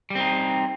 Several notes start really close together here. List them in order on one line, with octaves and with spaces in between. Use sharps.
G3 C4 D#4